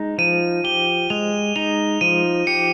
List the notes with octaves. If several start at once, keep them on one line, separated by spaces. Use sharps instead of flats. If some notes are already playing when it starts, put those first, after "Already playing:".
Already playing: G#3 D#4
F3 D#7
G4 G7
G#3 F7
D#4 F7
F3 D#7
G4 C#7